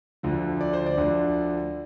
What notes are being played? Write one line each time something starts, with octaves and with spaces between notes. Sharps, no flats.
D2 D3 F3
D5
C5
D5
D2 D3 F3